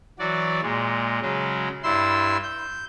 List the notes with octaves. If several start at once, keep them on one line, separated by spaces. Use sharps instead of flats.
E3 F#3 F#4 D5
A#2 G#3
C#3 F#3 G#3
G2 E4 C6 E6
G6